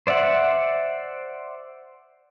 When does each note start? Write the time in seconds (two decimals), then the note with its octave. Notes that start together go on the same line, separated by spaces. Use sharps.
0.07 C5 D5 E5 F#5